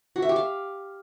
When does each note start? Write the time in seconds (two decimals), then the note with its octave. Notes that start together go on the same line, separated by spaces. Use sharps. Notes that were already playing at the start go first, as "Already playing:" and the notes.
0.16 F#4
0.22 E5
0.29 G4
0.36 F5